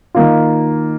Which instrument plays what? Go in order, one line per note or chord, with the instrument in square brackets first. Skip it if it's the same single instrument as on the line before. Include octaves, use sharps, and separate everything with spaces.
[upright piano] D#3 A#3 F4